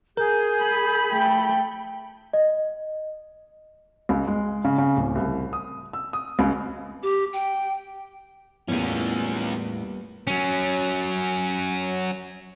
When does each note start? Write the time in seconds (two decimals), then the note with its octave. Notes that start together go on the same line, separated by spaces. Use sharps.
0.17 G#4 A#4 G6
0.59 B5
1.12 A3 G5
2.33 D#5
4.09 C#2
4.28 G#3
4.65 C#3
4.78 C#3
4.97 D1
5.15 C2
5.53 D#6
5.93 E6
6.13 D#6
6.39 C#2
7.03 G4
7.33 G5
8.68 E2 A2 G3 A#3 B3 C#4 F4
10.27 F#3 C#4